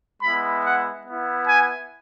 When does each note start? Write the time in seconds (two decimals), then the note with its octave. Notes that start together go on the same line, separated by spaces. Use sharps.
0.22 G#3 B3 E4 B5
0.63 F#5
1.05 B3 E4
1.47 G#5